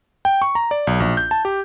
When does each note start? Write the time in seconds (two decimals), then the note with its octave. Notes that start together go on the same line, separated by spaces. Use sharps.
0.25 G5
0.42 C#6
0.55 A#5
0.71 D5
0.87 B1
1.00 A#1
1.17 G6
1.31 A5
1.45 G4